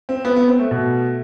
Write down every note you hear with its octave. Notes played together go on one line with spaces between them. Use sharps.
C4
B3
B3
C4
A3
B2